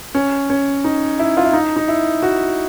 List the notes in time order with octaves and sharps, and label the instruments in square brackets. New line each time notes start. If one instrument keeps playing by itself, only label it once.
[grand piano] C#4
C#4
D#4
E4
F4
E4
D#4
D#4
E4
F#4